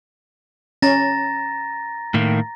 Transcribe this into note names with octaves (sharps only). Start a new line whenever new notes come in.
C#4 A#5 A6 A#6
A2 D#3 A#3